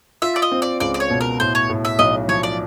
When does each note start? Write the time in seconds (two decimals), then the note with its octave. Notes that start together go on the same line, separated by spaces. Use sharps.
0.22 F4 E5
0.36 D5
0.42 D#5
0.52 C4
0.62 D5
0.80 C#2 D5
0.94 D5
1.00 C#5
1.10 B2
1.21 A#4
1.40 A2 C5
1.55 C#5
1.70 A2
1.85 E5
1.99 B1 D#5
2.28 F3 C#5
2.43 D5